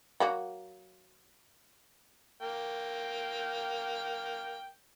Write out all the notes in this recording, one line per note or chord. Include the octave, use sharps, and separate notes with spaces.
F#3 A#3 F#4
A#3 G5